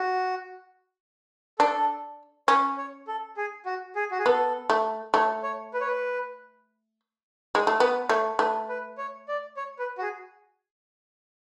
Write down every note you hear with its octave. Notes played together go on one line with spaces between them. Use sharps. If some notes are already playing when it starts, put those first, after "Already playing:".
Already playing: F#4
D4 A4
C#4 C#5
C#5
A4
G#4
F#4
G#4
F#4
G#4
B3 A4
A3
A3 C#5
C#5
B4
C#5
B4
G#3
A3
B3 B4
A3 C#5
A3 B4
B4
C#5
D5
C#5
B4
F#4
G#4